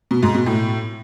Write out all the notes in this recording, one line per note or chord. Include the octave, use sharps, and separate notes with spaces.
B2
G#2
B2
A2